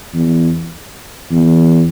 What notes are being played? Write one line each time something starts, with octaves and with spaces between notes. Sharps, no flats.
E2
E2